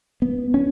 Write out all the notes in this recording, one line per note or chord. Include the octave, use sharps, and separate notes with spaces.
B3
C#4